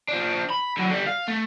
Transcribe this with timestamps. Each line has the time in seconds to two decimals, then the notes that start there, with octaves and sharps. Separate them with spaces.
0.08 F3 D4
0.50 B5
0.77 D3 F#3
0.90 D3 G3
1.07 F5
1.28 A3